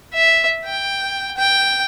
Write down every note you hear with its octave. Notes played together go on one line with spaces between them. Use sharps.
E5
G5
G5